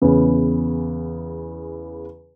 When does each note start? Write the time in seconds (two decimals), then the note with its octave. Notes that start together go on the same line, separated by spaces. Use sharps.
0.01 E2 C#3 B3